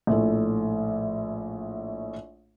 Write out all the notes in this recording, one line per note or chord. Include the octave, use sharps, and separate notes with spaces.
A#1 A2 A3